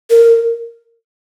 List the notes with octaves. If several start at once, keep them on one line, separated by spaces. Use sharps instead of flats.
A#4